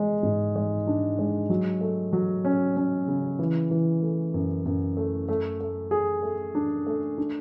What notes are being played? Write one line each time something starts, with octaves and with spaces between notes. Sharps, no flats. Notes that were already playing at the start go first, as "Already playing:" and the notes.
Already playing: G#3 G#4
G#2
G#3
D4
G#3
F#3
A3
F#3
C#4
C#4
C#3
E3
E3
A3
F#2
F#2
A3
A3
A3
G#4
A3
D4
A3
D4